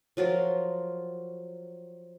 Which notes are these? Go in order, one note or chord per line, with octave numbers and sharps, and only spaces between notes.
F3 F#3 F4 A#4